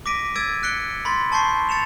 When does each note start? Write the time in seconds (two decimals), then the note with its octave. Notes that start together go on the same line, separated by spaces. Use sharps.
0.06 D6 A#6 B6 D7 D#7
0.36 E6 G#6 A6 D7 D#7
0.63 F#6 B6 C#7 D7 G7
1.05 B5 C6 A6 B6
1.32 A5 C6 C#6 G6 C7
1.69 A6 C#7 E7 F7